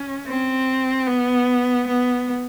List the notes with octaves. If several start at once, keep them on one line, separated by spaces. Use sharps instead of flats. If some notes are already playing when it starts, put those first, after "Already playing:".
Already playing: C#4
C4
B3
B3